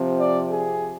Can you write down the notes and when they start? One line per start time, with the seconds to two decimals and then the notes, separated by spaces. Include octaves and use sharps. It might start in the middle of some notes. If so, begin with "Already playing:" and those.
Already playing: C3 F3 C4
0.20 D5
0.50 G#4